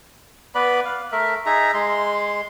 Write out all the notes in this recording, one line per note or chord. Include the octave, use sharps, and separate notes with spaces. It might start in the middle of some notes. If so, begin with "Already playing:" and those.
B3 B4 D5 B5
F5
A3 A#4 E5
D#4 G#4 E5 A#5
G#3 C6